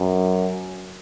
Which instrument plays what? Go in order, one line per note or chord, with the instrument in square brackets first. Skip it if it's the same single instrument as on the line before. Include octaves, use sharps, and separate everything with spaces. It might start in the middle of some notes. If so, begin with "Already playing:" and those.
Already playing: [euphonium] F#2